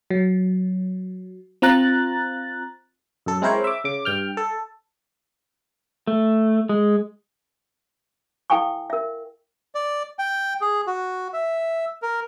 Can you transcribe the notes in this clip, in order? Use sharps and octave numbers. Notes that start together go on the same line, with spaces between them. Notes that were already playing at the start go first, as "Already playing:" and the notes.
F#3
C4 F4 A#5 F#6 A6
F#2 A4
G#3 C4 E4 A#4 C5 C#5
E5 D6
C#3 D6
G2 G5 F6
A4
A3
G#3
E4 A4 F5 G5 G#5 C#6
A#4 E5
D5
G5
G#4
F#4
E5
A#4